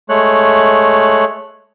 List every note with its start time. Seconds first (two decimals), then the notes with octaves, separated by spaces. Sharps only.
0.09 G#3 A3 C#5 F#6